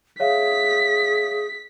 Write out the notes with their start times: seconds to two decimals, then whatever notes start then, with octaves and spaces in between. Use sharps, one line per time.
0.20 G#4 C#5 E5 F5 B6